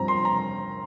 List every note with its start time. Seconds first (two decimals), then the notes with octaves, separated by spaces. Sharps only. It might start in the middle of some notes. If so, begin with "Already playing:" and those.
Already playing: G2 F3 C4 A#5
0.08 C6
0.25 A#5